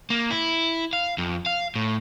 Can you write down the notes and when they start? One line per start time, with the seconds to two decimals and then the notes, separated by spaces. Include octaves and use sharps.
0.10 A#3
0.31 E4
0.93 F5
1.18 F2
1.46 F5
1.75 A2